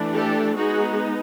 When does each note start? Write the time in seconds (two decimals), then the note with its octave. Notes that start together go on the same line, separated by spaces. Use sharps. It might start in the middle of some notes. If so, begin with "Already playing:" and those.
Already playing: E3 A3 D4
0.13 G4 A4
0.56 G#3 B3 D#4 F#4 G#4